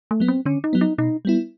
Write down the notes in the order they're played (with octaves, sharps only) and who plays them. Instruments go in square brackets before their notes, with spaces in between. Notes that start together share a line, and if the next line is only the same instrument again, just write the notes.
[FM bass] A3
[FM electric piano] F#3 B3
[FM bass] C4
[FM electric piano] D3 [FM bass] C#4
[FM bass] D#4
[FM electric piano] F#3 B3
[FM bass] D#4
[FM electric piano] B2 [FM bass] D#4
[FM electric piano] G3 B3 E4